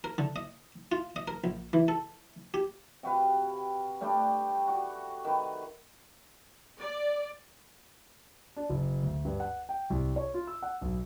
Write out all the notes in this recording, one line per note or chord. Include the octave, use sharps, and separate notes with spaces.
A#4
D3
D#5
F4
D#5
A#4
A#1
E3
A4
G4
C3 F#4 B4 F5
G3 A3 D4 G5
F#4
D#3 B4
D5
D4
F#1
D2
G2
F#5
G5
C2
C#5
F4
E6
F#5
B1